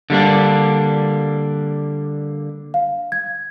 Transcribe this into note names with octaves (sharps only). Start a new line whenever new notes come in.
D3 G3 A#3 D4
F5
G#6